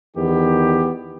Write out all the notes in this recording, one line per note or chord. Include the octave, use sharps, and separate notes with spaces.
E2 D#3 B3 G4